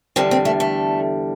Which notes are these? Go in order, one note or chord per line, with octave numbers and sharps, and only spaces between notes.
E2 D3 G3 C4
C4
A3
A3